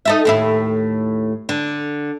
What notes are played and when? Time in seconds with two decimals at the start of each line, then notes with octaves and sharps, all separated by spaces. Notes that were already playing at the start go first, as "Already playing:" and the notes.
0.05 D#4 A4 E5
0.25 D#2 A2 E4
1.49 D3